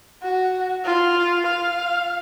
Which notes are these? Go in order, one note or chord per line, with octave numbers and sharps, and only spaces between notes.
F#4
F4
F5